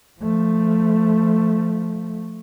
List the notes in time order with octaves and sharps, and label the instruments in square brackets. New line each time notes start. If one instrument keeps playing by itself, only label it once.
[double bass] F3 A3